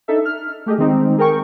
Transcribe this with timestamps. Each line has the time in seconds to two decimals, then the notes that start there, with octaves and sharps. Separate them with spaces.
0.08 D4 D#4 A4 E5
0.25 F6
0.66 A3 G4 G#4 D#5
0.78 D#3 G#3 C4 D#4
1.18 G#4 A#4 G5 C#6